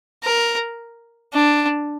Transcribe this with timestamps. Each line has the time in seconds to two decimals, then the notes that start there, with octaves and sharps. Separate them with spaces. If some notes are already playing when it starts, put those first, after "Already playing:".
0.23 A#4
1.33 D4